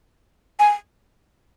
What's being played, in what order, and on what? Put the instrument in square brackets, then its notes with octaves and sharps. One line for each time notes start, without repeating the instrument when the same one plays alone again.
[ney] G#5